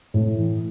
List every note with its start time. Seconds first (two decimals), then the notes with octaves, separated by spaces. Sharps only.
0.14 A2
0.37 E3